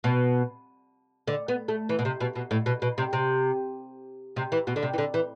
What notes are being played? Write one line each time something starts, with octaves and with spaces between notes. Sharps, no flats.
B2
D3
B3
A3
E3
B2
C3
B2
B2
A2
B2
B2
C3
C3
C3
E3
B2
D3
C3
E3
D3
E3